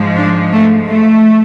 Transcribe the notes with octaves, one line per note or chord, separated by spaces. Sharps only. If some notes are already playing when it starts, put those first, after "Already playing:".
Already playing: G#2 F3 G#3
D4
A3
A3